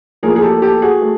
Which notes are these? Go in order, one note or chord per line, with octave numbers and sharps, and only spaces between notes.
A2 F3 A#3 G#4 A#4
G#4
G4 A4
G4 A4
F#4 G#4
A3